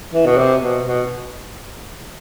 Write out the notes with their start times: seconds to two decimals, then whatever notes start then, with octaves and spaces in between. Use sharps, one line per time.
0.14 E3
0.26 B2
0.38 C3
0.62 B2
0.86 B2